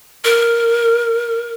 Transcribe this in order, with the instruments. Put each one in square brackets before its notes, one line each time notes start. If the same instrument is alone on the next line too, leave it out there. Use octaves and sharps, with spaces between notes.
[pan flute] A#4